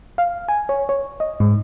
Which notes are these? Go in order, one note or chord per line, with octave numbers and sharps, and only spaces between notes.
F5
G#5
C#5
C#5
D#5
G#2